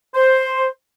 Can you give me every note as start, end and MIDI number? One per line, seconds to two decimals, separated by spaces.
0.15 0.67 72